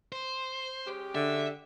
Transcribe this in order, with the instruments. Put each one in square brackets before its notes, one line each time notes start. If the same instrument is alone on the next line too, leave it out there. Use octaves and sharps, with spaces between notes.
[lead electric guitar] C5
[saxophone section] G#3 C#4 G4
[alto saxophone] D3 [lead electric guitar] E5